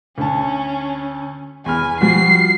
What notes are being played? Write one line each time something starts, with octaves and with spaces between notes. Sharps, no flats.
D2 C#4 A5
E2 G#5 B5 F6
F3 G3 F#4 C7